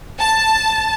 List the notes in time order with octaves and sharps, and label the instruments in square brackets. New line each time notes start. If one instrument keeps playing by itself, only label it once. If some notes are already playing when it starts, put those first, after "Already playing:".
[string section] A5